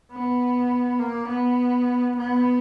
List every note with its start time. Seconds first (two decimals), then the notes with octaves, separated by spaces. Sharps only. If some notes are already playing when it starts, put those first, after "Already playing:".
0.12 B3
0.99 A#3
1.29 B3
2.17 B3